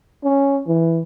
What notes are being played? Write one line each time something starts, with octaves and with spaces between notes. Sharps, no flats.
C#4
E3